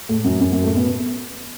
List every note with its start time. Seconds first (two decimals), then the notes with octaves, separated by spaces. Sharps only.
0.09 A2 A3
0.24 F#2 F#3
0.41 F#2 F#3
0.52 F#2 F#3
0.64 A2 A3
0.75 B2 B3